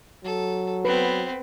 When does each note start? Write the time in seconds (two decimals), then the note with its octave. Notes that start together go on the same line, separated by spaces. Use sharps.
0.25 F#3 A4
0.85 B3 C4 B4